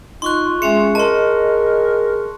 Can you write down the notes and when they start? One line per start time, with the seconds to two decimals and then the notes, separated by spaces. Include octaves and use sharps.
0.22 D#4 F4 C6 C#6 F#6
0.62 G#3 C#4 G#4 E5 C#7
0.95 A#4 D#5 A5 C6